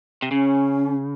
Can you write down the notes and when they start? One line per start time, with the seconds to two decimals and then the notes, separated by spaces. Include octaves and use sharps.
0.22 C3
0.31 C#3 C#4